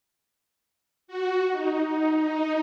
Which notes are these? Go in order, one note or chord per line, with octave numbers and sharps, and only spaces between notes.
F#4
D#4
D#4
D#4